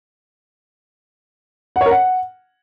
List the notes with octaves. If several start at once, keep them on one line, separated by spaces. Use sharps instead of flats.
F#5
C#5
A#4
F#5